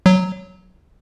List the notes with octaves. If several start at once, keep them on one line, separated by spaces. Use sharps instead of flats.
F#3